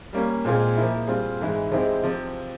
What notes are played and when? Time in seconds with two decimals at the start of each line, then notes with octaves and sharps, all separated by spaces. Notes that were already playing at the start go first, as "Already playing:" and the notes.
0.13 G3 A#3 C#4
0.45 A#2 G#3 C4 F4 G#4
0.77 F3 A#3 E4
1.07 G3 C4 F4 G#4
1.40 G#2 E3 G#3 E4
1.71 C3 F3 G#3 C4 E4
2.03 C3 F3